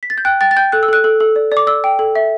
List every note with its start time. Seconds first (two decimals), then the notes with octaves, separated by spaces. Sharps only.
0.03 B6
0.10 A6
0.18 G6
0.25 G5 F#6
0.41 G5 A6
0.51 A6
0.56 G5 G6
0.72 A4 F#6
0.83 E6
0.88 A4 F#6
1.04 A4
1.20 A4
1.36 D5
1.52 D5
1.57 D6
1.67 D5 E6
1.84 G5
1.99 A4
2.16 E5